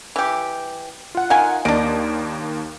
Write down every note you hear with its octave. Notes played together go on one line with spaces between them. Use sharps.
E3 G4
F4 F#5
D#3 F5 G#5
D#2 A#3 D4 D#5 D7